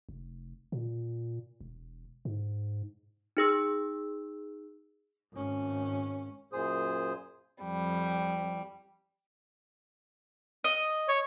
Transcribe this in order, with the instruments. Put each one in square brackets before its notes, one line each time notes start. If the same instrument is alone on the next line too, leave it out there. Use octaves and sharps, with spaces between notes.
[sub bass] F1
A#2
E1
G#2
[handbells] D#4 G#4 E6
[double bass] G#1 C#4
[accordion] F#2 A#2 G#4 C5 D#6
[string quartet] F2 G3
[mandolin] D#5
[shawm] C#5